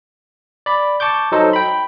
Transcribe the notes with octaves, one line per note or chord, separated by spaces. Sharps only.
D5 B5
A5 C#6 D6 G6
F#3 D#4 A4 C5 D#5
G5 B5